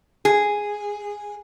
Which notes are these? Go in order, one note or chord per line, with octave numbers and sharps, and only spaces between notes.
G#4